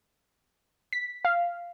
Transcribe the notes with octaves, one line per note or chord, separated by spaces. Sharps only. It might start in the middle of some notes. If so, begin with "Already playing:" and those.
B6
F5